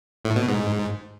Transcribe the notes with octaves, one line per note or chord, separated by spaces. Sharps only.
A2
B2
G#2